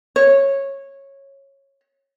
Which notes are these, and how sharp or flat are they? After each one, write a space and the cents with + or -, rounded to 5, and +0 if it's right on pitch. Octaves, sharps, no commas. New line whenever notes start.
C#5 -15